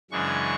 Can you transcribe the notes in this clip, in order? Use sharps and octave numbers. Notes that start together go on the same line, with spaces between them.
F#2 C#3 E3 G#3 D4 C#6